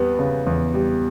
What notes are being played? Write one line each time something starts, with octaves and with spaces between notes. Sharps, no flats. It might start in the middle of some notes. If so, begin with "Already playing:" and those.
Already playing: E2 G3 B3
C#3
E2
G3